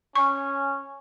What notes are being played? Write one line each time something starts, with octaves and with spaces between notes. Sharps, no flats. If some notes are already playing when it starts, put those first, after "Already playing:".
C#4 C#6